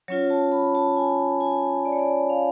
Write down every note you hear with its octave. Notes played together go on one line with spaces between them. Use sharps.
F#3 C#4 F4 C#5
A5
B5
A5
G#5
G#5
D5
C#5
D5
F5